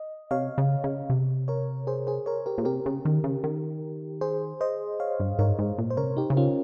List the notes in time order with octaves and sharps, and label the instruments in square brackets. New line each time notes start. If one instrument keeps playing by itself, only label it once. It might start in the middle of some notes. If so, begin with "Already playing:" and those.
Already playing: [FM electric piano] D#5
[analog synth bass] C3 [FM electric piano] C#5 F5
[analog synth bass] C#3
C#3
C3
[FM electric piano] A#4 C#5
G#4 C5
G#4 C5
A#4 C#5
G4 A#4
[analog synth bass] A#2
[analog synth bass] C3 [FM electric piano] G4 A#4
[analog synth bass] C#3
D#3
C#3
D#3
[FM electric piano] G#4 C5
C5 D#5
C#5 F5
[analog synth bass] G2
[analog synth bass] G#2 [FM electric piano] A#4 C#5
[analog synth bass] G#2
A#2
[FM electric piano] C5
[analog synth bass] C#3 [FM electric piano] A#4 C#5
[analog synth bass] C3
[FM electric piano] D#4 G4
[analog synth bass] C#3
[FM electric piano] C#4 F4